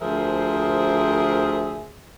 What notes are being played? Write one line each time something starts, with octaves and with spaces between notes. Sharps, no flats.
D2 F3 G#4 A#4 C5 E5